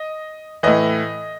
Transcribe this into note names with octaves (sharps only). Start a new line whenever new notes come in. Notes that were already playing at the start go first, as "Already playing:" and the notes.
Already playing: D#5
A2 E3 D#5